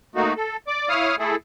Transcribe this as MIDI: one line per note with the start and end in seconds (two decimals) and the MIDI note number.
0.15 0.33 57
0.15 0.33 58
0.15 0.33 63
0.15 0.33 66
0.37 0.57 69
0.68 0.89 74
0.68 0.89 86
0.89 1.16 64
0.89 1.16 73
0.89 1.16 77
0.89 1.16 87
0.89 1.16 89
1.19 1.36 57
1.19 1.36 64
1.19 1.36 68
1.19 1.36 69